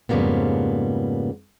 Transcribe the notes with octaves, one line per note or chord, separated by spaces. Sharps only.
F2 G#2 C#3 G3 A#3 B3